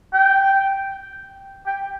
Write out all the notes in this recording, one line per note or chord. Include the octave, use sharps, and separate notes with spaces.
G5
G5